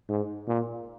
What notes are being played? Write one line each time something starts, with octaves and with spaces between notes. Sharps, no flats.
G#2
A#2